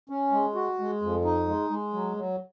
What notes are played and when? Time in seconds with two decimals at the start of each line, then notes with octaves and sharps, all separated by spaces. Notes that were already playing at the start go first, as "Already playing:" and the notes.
0.09 C#4
0.32 G#3
0.55 F#4
0.79 G#3
1.02 F2
1.25 D#4
1.48 G#3
1.70 G#3
1.94 F#3
2.17 F#3